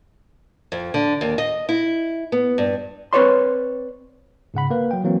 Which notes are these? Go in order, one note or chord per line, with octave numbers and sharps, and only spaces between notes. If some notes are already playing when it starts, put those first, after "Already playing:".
F2
D3
D#2
D#5
E4
B3
G2
C4 B4 C#5 D5 C6
G#2 C#3 F#5 B5
A#3 B4
F#3 G5
E3 F#3 A#3 C4